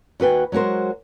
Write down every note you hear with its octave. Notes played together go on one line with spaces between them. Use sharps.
D#2 F#4 B4 G5 G#5
F#3 G#3 F#4 A#4 C5